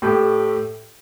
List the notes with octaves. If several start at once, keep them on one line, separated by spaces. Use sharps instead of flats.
A2 A3 G4